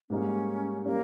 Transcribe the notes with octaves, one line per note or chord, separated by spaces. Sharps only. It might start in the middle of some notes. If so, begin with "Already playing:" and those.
G#2 G3 A#3 C#4 D#4
G3 A#3 C#4